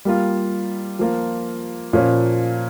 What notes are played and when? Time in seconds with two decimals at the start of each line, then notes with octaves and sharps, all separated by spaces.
0.05 G3 A#3 F4
0.99 F3 A#3 F4
1.93 A#2 F3 A#3 C#4